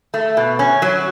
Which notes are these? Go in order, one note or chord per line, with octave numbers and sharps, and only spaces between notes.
A3
B2
C#4
F#3